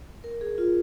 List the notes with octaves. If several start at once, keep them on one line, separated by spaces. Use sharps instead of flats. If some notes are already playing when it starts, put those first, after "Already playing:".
A#4
G#4
F4